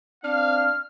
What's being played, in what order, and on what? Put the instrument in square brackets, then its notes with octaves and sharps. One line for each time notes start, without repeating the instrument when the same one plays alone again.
[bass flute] C4 [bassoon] D4 [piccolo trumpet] F5 [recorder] F6